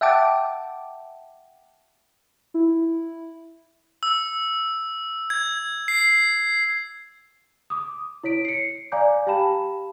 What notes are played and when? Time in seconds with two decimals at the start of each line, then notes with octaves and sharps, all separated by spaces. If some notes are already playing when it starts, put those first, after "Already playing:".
0.01 E5 F#5 G5 A5 D6
2.54 E4
4.03 E6
5.30 G#6
5.88 C7
7.70 D6 D#6
8.23 E4 C#5 B6 D7
8.45 C7 C#7
8.92 D5 F5 G#5 A#5 D6 G6
9.27 G4 F5 G5 A5 B5 E7